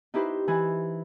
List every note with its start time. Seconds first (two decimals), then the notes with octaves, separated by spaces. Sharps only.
0.14 D#4 E4 G4 B4 C5
0.48 E3 E4 G#5